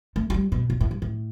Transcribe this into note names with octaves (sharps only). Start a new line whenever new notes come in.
A3
F#3
G3
B2
B2
A2
G2
A2